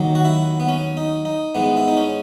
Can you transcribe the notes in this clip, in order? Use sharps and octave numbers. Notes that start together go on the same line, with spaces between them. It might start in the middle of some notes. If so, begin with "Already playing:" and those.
Already playing: D#2 D#3 F#3
F#4
E4
B3
C#4
D#4
D#4
G#2 E3 G#3 B3
E4
D#4
C#4